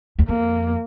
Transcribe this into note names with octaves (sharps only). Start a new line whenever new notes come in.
E2
F2 A#3